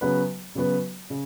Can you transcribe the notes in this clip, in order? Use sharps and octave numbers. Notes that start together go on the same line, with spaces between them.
C#3 F#3 B3 F#4 B4
C#3 F#3 B3 F#4 B4
C#3